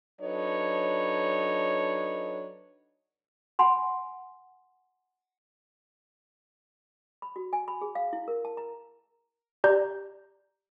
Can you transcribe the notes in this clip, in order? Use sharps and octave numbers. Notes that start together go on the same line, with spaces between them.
F#3 D4 D#4 A4 B4 C#5
F#5 G#5 B5 C6
B5
F#4
G#5
B5
G#4
F5
E4
A#4
A5
A#5
G4 D5 A#5 G6